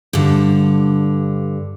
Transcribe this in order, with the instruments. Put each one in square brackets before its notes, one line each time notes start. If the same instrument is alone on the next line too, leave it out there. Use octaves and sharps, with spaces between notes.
[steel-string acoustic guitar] G2 D3